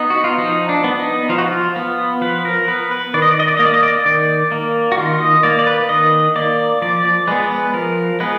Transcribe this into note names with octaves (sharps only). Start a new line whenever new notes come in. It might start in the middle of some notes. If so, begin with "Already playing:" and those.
Already playing: B3 D#4
F#4
F4
F3 D#4
D4
B3
D#4
F3 F4
F#4
F4
B3
F3 B4
A#4
B3 B4
B4
D#3 D5
D#5
D5
D#5
D5
A#3 D#5
D5
D#5
D5
D#3 D5
A#3
F#4
D#3 F4
D#5
A#3 D5
D5
B4
D#3 D#5
A#3 D5
F3 D5
D5
G#3 B3 B4
B4
F3 A#4
G#3 B3 B4